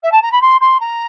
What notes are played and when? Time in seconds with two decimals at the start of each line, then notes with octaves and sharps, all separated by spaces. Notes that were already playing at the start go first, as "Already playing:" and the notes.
0.03 E5
0.11 A5
0.22 A#5
0.31 B5
0.41 C6
0.61 C6
0.80 A#5